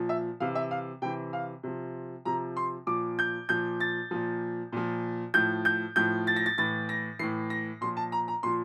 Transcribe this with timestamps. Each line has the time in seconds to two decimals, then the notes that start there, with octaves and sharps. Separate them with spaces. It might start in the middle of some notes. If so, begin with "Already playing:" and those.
Already playing: A#2 F3
0.09 E5
0.40 C3 E3 F5
0.55 E5
0.71 F5
1.02 C3 E3 G5
1.33 F5
1.63 C3 F3
2.25 C3 F3 A#5
2.57 C6
2.87 A#2 F3 D6
3.19 G6
3.49 A#2 F3 G6
3.80 A6
4.11 A#2 F3
4.72 A#2 F3
5.34 A2 F3 G6
5.65 G6
5.96 A2 F3 G6
6.27 A6
6.36 A#6
6.46 A6
6.58 A2 E3 A6
6.89 A#6
7.19 A2 E3 C7
7.50 A#6
7.81 A#2 F3 C6
7.97 A5
8.12 A#5
8.28 A#5
8.43 A#2 F3 C6